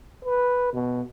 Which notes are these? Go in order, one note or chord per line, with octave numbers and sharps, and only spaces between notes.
B4
B2